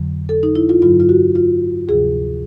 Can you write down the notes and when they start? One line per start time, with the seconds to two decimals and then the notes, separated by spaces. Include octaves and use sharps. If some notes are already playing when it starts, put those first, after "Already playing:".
Already playing: F2 D3 F#3
0.29 A4
0.43 D#4
0.55 E4
0.69 F4
0.82 G2 D3 F#3 F4
1.00 F4
1.09 F#4
1.35 F4
1.88 D2 C3 F3 G#4